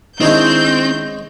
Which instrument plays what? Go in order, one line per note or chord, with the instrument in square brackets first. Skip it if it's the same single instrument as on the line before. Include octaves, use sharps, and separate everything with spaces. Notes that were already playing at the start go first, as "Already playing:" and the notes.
[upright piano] D#3 D4 E4 [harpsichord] G#3 C#5 D#5 [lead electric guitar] C4 [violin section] G6